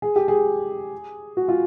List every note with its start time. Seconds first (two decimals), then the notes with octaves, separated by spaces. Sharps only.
0.02 G#4
0.16 G4
0.28 G#4
1.37 F#4
1.48 F4